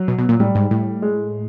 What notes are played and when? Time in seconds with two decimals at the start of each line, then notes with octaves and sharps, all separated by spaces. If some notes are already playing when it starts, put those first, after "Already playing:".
Already playing: F#3
0.08 B2
0.19 B2
0.29 A#2
0.40 A2 G3
0.55 G#2
0.71 A2
1.02 G#3